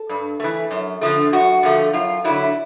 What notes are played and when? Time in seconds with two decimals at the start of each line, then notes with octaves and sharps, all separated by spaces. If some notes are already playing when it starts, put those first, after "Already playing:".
Already playing: A4
0.09 G2
0.40 E3 A3
0.71 F#2
1.01 D3 F3 A3
1.33 F#2 F#4
1.63 D3 F3 A3
1.93 F#2 F4
2.24 D3 F#3 E4